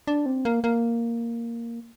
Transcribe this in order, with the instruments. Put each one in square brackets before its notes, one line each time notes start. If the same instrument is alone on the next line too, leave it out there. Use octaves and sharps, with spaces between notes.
[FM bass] D4
C4
A#3
A#3